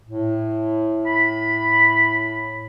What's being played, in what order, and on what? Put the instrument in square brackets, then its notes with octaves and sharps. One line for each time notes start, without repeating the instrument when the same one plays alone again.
[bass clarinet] A2
[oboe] B5